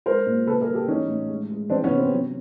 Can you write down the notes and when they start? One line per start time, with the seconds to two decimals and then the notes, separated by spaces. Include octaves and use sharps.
0.06 G#3 A#4 C5
0.26 A#2
0.47 C#3 A4 B4
0.61 G#4 A#4
0.67 G3
0.74 G4 A4
0.87 E3 C#4 D#4
1.08 A2
1.28 G#3
1.50 G#3
1.69 E3 C4 D4
1.84 B3 C#4
1.90 C3
1.97 C4
2.11 F#3